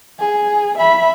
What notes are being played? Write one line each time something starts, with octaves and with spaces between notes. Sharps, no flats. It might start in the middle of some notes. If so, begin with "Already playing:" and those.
G#4
E5 B5